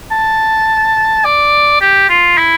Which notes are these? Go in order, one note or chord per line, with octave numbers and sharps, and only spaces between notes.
A5
D5
G4
F4
E4